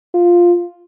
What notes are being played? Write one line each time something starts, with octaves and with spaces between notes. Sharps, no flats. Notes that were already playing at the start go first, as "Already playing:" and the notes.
F4